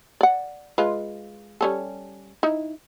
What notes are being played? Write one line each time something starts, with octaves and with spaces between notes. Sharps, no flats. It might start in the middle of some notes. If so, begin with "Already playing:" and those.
D5 F#5
G#3 F4 B4
G3 C#4 A4
D#4 E4